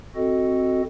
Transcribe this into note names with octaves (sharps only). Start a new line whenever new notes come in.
C4 F#4 A4 D#5